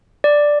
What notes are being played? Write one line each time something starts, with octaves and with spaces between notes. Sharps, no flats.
D5